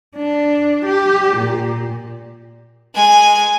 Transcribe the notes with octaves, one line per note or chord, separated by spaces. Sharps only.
D4
G4
A#2
G#3 G#5